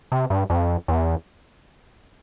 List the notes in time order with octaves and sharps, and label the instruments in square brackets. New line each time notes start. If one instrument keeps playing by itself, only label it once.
[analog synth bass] C3
G2
F2
E2